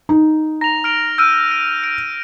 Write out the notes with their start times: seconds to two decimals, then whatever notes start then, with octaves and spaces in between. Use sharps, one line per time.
0.09 D#4
0.61 A#5 A#6 F7
0.84 F6 D7 F7
1.18 E6 F6 G6 D7 D#7
1.51 D7
1.84 D7